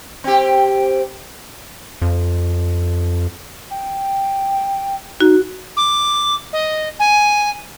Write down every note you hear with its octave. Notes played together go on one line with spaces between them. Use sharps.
C4 G4
F2
G5
D#4 F#4
D6
D#5
G#5